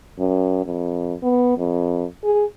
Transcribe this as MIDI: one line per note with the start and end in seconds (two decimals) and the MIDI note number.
0.19 0.62 42
0.66 1.14 41
1.23 1.53 59
1.58 2.05 41
2.24 2.44 68